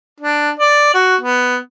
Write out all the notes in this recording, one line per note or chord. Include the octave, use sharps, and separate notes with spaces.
D4
D5
F#4
B3